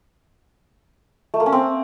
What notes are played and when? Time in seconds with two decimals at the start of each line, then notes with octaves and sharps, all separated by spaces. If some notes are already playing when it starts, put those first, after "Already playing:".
1.34 A3
1.40 A#3
1.46 C#4
1.52 C4